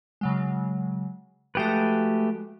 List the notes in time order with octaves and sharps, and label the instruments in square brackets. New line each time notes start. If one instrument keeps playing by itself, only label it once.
[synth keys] C#3 F#3 G#3
[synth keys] F3 G#3 F#4 [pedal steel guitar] A3 G4 B4